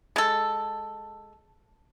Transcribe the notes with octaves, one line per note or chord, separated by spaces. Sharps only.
G#3 A4